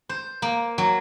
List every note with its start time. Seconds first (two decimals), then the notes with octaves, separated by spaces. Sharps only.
0.09 C5
0.42 A#3
0.78 F#3